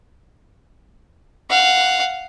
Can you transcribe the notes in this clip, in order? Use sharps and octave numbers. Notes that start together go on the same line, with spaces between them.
F5 F#5